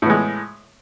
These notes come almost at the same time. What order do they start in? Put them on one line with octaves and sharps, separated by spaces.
A2 B3 G#3